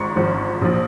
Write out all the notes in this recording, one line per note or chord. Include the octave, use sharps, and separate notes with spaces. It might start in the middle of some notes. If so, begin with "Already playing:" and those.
Already playing: G#1 G#2 F3 C6 C#6
G#1 G#2 F3
A#1 F3